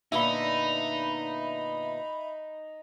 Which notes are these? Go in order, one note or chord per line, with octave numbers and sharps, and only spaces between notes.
A#2 D3 B3 D#4 E5 B5